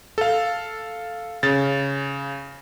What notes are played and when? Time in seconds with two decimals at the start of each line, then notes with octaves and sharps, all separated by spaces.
0.18 A4 F5
1.43 C#3 A6